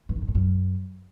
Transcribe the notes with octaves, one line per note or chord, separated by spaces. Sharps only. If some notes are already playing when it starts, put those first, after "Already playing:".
G2
D#3
G#2
A2
F#2